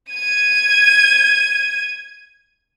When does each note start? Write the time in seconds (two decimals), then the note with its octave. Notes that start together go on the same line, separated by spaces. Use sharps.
0.11 G#6 D#7